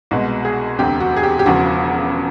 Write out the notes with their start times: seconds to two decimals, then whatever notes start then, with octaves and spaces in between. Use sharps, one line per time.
0.11 C2 B2 G#3 F#4
0.45 G#4
0.78 E1 D2 C3 G4
1.00 F#4
1.17 G#4
1.23 G4
1.39 G4
1.46 E1 E2 C#3 F3 F#4